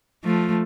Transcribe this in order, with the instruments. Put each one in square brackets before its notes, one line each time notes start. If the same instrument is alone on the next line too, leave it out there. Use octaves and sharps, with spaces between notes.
[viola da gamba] F3 A3